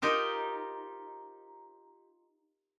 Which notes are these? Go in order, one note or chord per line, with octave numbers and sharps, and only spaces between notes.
D#4 F4 G4 A#4 C5